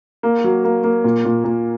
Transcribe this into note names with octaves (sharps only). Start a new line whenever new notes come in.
A#3
F#3
A#3
A#3
A#2
A#2
A#2